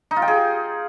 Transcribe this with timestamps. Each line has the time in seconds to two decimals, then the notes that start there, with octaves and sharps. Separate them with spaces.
0.11 D#4
0.16 F4
0.22 G5
0.28 G#4